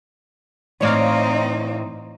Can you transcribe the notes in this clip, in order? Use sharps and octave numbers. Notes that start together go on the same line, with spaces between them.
A2 E3 C4 D#4 C#5 D5 F5